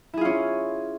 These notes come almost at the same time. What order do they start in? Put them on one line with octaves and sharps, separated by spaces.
E4 G#4 F4 C#4